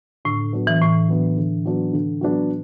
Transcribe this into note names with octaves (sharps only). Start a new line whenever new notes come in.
A2 D3
F#3 B3 D4
E3
A2 D3
F#3 B3 D4
D3
F#3 B3 D4
D3
F#3 B3 D4